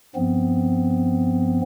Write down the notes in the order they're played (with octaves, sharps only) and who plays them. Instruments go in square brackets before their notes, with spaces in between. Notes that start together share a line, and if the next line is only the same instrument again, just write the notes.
[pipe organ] G2 F3 B3 C4